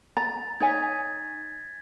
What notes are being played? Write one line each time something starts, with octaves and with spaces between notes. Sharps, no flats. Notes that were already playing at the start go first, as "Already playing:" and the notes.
A#5 A6
D#4 C#5 G#5 G#6 B6